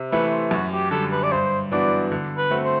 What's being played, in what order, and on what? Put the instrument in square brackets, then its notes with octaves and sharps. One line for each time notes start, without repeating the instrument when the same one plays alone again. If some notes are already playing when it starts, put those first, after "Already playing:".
Already playing: [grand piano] C3
[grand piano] E3 A3 [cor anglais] B4
[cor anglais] C5
[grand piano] F#2 [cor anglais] F#4
[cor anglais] G4
[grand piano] D3 G3 [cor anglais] A4
[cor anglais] B4
D5
[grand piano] G2 [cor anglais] C5
[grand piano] E3 B3 D4 F#4 [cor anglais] D5
[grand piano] D3
[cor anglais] B4
[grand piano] A3 C4 F#4
[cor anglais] C5